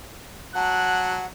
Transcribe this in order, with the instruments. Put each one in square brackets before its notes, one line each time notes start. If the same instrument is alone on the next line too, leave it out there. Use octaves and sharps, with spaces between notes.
[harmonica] F#3 [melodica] F#5 [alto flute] A5 [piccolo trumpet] F#6